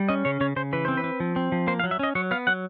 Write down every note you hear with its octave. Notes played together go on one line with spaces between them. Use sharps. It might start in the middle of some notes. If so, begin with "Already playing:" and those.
Already playing: G3
C#4 D#5
C#3 C#5
C#3 C#5
C#3 C5
E3 B4
C4 C5
B4
C4
F3
C4
F3
A#3 C5
F5
F#3
E5
C#4 D#5
F#3 C#5
B3 F5
F#3 F#5